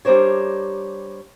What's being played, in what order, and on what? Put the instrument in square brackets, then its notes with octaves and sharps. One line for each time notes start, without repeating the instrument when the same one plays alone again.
[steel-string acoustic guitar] G3 D4 A#4 C5 C#5